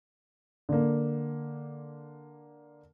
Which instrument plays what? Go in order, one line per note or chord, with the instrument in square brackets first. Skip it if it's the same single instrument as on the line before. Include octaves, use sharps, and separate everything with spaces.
[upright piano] D3 A#3